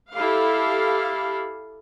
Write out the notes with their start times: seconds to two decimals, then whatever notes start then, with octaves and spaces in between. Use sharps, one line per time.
0.14 E4 G4 A4 F5